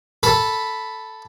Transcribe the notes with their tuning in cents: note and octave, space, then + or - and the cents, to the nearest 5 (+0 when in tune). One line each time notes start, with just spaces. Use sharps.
A4 +0 B5 +0